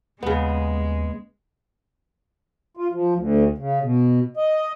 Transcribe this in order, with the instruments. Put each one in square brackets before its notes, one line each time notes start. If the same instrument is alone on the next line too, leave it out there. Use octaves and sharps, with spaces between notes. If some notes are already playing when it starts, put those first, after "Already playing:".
[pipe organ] D#2 [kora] C#3 B3 [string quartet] G#3
[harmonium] F4
F3
D2
C#3
B2
D#5